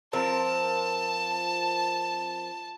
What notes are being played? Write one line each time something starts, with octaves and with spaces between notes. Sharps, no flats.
F3 C4 A#4 A5